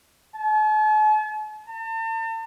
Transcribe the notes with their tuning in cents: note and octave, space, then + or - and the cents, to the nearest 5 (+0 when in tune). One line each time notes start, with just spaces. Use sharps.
A5 -45
A5 +40